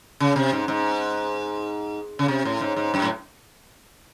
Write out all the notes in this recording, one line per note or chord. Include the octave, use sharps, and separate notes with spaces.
C#3
C3
G#2
G#2
C#3
C3
A2
G#2
G#2
F#2
A2